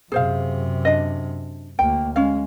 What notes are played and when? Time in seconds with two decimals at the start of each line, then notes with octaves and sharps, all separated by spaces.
0.12 F#2 C3 G#4 C5 F5
0.85 D4 D#5
1.79 D2 A#3 G5
2.16 G#3 C#4 F5